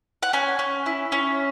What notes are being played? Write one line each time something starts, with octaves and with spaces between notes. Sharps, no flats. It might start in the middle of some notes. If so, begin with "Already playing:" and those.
F#5
C#4 G#5
C#4
E4
C#4